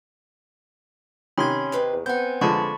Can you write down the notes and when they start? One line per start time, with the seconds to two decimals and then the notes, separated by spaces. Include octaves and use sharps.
1.38 C3 D#3 C#4 B5 C6 G#6
1.72 D#2 C4 B4
1.93 E2
2.06 B3 C4 F#5 G#5 G6
2.41 F2 D3 F3 G#3 A5 B5 C#6